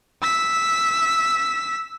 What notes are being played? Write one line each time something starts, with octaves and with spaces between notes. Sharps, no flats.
E6 B6